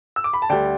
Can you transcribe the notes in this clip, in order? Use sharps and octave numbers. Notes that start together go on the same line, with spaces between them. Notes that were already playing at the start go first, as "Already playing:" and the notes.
E6
D6
B5
A5
D2 D3 G3 D5 G5